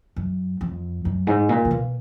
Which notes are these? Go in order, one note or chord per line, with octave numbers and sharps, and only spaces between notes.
F#2
F2
F#2
G#2
A#2
C#3
B2